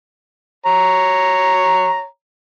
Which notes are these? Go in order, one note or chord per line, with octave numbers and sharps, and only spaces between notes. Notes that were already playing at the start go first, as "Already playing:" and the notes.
C#5 A#5